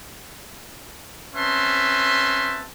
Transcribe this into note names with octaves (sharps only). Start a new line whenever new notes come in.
C4 C#4 B4 E5 A5 C6